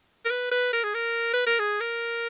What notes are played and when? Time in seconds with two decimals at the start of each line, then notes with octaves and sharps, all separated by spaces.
0.25 A#4
0.30 B4
0.51 B4
0.73 A#4
0.84 G#4
0.94 A#4
1.34 B4
1.46 A#4
1.59 G#4
1.80 A#4